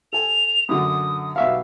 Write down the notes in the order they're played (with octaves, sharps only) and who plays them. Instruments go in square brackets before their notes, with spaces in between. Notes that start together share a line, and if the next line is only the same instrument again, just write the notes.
[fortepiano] A4 G#5 [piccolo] F7
[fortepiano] F#2 D3 [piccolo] D#6
[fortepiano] B1 E5 F5